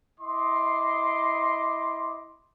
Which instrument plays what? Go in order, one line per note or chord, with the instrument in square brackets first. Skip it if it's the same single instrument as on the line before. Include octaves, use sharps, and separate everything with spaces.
[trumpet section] E4 D#5 C6 D6